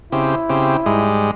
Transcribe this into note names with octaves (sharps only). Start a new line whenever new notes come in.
C#3 C4 E4 G4
C#3 C4 G4
G#2 G3 G#3